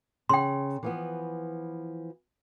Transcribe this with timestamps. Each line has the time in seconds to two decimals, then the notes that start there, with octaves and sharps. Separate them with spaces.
0.29 C#3 G5 C6
0.83 E3 F3 B3